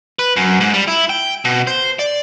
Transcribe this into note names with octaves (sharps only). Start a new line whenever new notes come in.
B4
F#2
G#2
G3
E4
G5
B2
C5
D5